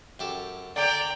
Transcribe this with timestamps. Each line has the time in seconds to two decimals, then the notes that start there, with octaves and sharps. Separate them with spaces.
0.19 F#2 G4 A4
0.76 D3 D5 G5 A#5